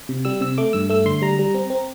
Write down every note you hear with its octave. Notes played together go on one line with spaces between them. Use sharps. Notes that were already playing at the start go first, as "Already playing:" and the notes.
C3
G3 E6
C3 E6
A3 D6
G2 E6
A3 E6
D3 C6
G3 A#5
G3
C4
C4